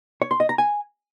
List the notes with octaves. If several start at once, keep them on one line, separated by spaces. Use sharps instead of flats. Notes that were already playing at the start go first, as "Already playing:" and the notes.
C#5
C6
D#5
A#5
G#5